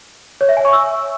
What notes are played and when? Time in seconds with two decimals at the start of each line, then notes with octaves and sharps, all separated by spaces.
0.41 C#5
0.49 E5
0.57 G#5
0.65 C#6
0.73 E6